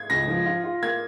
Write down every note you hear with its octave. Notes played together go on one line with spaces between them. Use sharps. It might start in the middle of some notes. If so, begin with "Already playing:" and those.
Already playing: G#6
C#2 A#6
F3
F4
F4
A#3 G#6